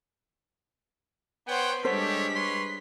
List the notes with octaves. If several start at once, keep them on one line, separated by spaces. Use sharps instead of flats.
B3 C5 C#5 F#5 G5
G3 G#3 D4 G4 A4 C5 C#5 B6
B4 C#5 C6